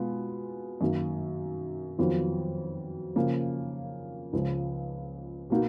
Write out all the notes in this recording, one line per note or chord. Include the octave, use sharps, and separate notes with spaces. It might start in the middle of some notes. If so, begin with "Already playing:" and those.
Already playing: B2 G#3 B3 F4
F#2 D#3 A#3
F2 D#3 F#3 B3 F4
C#3 F3 A#3
C#2 C#3 F3
B2 A#3 D#4 F#4